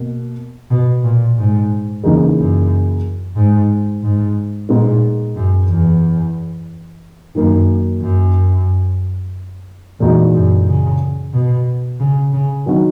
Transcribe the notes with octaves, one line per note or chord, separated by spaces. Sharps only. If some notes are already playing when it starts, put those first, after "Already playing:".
Already playing: B2 A#3
B2
A#2
G#2
E2 C#3 E3 A#3 D#4 G#4
F#2
G#2
G#2
A#2 G#3 B3 D#4
F#2
E2
F#2 D#3 F#3 A#3
F#2
E2 A#2 G#3 D#4 F#4
F#2
C#3
B2
C#3
C#3
D#3 F#3 B3 F#4